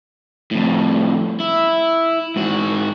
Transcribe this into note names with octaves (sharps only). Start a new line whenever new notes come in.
F2 A2
E4
G#2 F#4